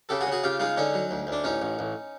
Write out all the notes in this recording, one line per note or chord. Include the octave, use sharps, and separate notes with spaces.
C#3 G4 A4
F#4 G#4
C#3
F#4 G#4
C#3 F4 G4
G#3 D#4 F4
D3 C#4 D#4
F#3
D2
D2
D4
A1 C#4 D#4
A1
A1